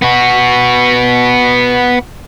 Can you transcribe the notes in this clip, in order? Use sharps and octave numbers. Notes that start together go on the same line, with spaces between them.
B3 F#4